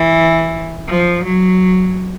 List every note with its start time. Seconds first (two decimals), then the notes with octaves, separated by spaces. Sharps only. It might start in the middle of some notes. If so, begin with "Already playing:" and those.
Already playing: E3
0.89 F3
1.23 F#3